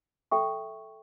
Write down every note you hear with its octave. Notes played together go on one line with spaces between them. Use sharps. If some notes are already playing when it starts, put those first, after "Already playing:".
A4 E5 G5 C#6